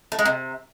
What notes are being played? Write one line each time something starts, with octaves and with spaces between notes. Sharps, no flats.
A3
G#3
C3